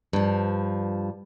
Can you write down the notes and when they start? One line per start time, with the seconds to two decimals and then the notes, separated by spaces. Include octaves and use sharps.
0.13 G2 F3